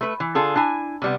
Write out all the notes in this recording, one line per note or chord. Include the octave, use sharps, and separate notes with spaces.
A3 B4
E3
D3 F4 G#4 A4
D4 E4 G#5
C3 G3 B3